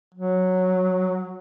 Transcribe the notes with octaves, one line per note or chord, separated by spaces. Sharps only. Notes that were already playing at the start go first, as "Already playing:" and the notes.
F#3